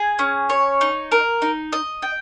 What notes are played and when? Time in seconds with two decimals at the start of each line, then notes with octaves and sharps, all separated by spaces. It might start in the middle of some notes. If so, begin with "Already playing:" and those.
Already playing: G#4
0.19 C#4
0.49 C#5
0.81 D#4
1.12 A#4
1.42 D#4
1.72 D#5
2.02 G5